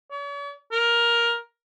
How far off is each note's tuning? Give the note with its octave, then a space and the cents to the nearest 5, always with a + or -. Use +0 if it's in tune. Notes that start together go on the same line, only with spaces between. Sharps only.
C#5 +45
A#4 +10